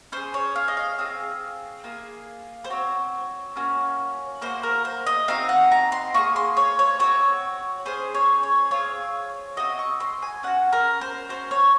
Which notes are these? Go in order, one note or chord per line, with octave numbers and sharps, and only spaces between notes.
C#4 G#4 C5
C#5
F5
D#5
F5
C4 F4 G#4 F5
A#3 F4 G#4
C5
C4 F#4 C#5
A#3 C#4 F#4
A#3 D#4 F#4 C5
A#4
C5
D#5
C4 D#4 F#4 F5
F#5
A#5
C6
A#3 F4 G#4 C#6
C6
C#5
C#5
C4 D#4 F#4 C#5
C#4 G#4 C5
C#5
C#5
C4 F4 G#4 C#5
C4 D#4 F#4 D#5
C#6
C6
G#5
C#4 F#4 F#5
A#4
C5
C#4 F#4 C5
C#5